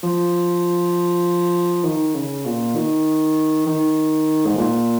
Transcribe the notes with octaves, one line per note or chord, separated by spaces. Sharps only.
F3
D#3
C#3
A#2
D#3
D#3
G#2
A#2